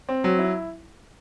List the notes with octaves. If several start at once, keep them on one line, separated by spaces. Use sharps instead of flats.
C4
F#3
E4